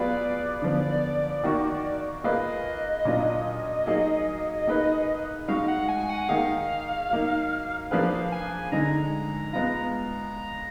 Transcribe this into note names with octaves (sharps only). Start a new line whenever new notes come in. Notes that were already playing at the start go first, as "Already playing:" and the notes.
Already playing: F#3 B3 F4 G#4 B4 D5
D3 F3 B3
D#3 A#3 D#4 F#4
A#3 F4 G#4 B4 D#5
A#2 F#3 D4 F4
F#3 A#3 D#4 G#4
A#3 D#4 G#4 B4
G#3 D#4 F#4 F5
F#5
G#5
G#5
F#5
D#3 A#3 D#4 G#4 F5
F#3 A#3 D#4
F3 A#3 D4 G#4 B4 F5
G#5
D3 G#3 D#4 A#5
G#3 B3 F4 A#5